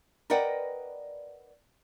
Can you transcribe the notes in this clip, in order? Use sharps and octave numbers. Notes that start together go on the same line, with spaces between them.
A#4 B4 D5 D#5 F#5 G5